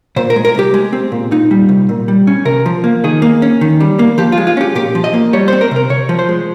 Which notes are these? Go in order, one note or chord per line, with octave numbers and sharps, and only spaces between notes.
A#2 C5
A#4
G#3
A#4
C2 G4
G#3
C4
A#2
A#2 D#4
G3
C2
A#2
G3
C#4
C3 A#4
F3
A#3
D#3 G#4
A#3
C#4
D#3
G3
A#3
F3 G4
F4
G#3
F4
C#4 G4
A#2 G4
F3
D#5
A#3
G3 C#5
C5
C4
A#4
C3 A#4
C3 C#5
F3
C5
G#3